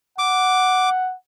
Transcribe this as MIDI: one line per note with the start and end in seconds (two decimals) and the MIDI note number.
0.19 1.14 78
0.19 0.89 86